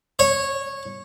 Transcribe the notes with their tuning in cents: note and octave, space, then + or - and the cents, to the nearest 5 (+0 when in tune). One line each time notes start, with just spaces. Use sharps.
C#5 -15